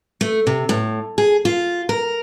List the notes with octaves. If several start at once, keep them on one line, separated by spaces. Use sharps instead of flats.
A3
C3
A2
G#4
F4
A#4